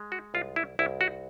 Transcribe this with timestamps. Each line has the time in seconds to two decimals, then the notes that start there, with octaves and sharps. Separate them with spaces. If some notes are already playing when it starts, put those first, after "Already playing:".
Already playing: G#3
0.12 F#4
0.34 C2 F4
0.56 E4
0.79 C2 E4
1.01 F#4